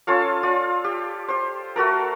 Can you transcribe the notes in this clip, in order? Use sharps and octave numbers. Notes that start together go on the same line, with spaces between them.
C#4 F4 A4 F5
F4 D5
G4
G4 C5
A3 F#4 A4 A#4